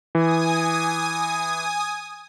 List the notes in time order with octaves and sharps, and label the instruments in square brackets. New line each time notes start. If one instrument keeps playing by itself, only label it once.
[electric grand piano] E3 [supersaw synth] G#5 D#6